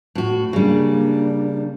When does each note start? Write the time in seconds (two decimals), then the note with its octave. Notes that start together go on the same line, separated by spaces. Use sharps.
0.15 A2 F#4
0.53 C#3 G3 A#3 D4